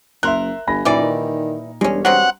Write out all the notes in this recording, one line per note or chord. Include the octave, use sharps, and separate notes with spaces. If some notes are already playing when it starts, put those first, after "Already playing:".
F#1 A#4 E5 C6 F#6
G1 G#5 B5 A#6
F#2 A#2 E3 G3 D#4 D5
D#3
E1 G3 G#3 C#4 D4
F#3 B3 C4 F#5